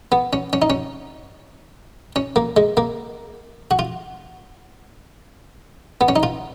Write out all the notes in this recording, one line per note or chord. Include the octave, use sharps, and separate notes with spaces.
B3
C#4
C#4
D#4
C#4
C#4
A#3
G#3
A#3
F#4
F4
B3
C#4
D#4
F4